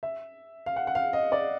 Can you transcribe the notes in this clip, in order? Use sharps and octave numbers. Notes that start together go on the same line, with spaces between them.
E5
F5
F#5
F#5
F5
D#5
D5